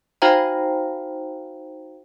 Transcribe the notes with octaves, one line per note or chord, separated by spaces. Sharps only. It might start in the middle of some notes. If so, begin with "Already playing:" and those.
D#4 F#4 C5 F5 G5 A#5